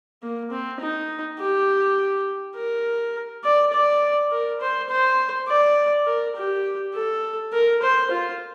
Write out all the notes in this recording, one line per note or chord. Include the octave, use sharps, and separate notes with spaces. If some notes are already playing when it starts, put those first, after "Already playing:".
A#3
C4
D#4
G4
A#4
D5
D5
A#4
C5
C5
D5
A#4
G4
A4
A#4
C5
F4